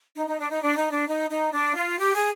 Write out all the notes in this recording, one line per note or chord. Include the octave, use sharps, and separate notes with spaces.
D#4
D#4
D4
D#4
D4
D#4
D4
D#4
D#4
D4
F4
G4
G#4